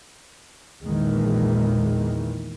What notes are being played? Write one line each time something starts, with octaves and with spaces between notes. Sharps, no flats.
A#1 E2 A#2 D#3 E3 G#3